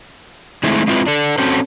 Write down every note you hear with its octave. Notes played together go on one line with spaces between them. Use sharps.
D#3 G#3 A3 C4 E4
G#3 C4 E4 F4 B4
D4 A4
C4 C#4 F#4 A4 C5